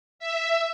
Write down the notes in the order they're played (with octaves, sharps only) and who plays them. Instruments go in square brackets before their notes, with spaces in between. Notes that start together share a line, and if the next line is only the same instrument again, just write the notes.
[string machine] E5